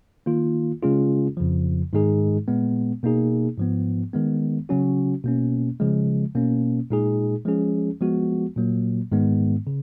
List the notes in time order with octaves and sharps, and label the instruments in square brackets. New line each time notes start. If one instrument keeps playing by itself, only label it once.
[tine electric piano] D#3 A#3 F4
C#3 G#3 C#4 F4 G#4
F2 C#3 F3
G#2 D#3 G#3 D#4 G#4
A#2 G#3 B3
B2 A#3 D#4 G#4
G#2 F3 B3
D#3 G#3 B3
C#3 F#3 C#4 F#4
B2 A#3 C#4
C#3 F3 G#3
B2 A#3 C#4
A#2 G#3 D#4 G#4
F3 G#3 C#4 G#4
F3 G#3 B3 F#4
A#2 F#3 A#3
G#2 D#3 G#3 B3
C#3